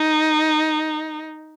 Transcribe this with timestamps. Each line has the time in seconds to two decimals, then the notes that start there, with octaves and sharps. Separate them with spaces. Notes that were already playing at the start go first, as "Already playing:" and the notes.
Already playing: D#4